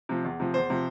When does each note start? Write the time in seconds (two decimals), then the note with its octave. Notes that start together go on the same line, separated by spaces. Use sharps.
0.09 C3 F3
0.24 E2
0.40 C3 F3
0.54 E2 C5
0.70 C3 F3